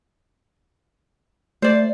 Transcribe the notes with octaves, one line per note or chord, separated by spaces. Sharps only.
A3 C5 D5